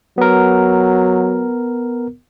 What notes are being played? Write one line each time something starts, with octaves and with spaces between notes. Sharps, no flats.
F#3 B3 A#4